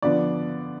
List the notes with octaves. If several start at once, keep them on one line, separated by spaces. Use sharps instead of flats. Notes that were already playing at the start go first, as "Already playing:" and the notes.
D3 F3 B3 D5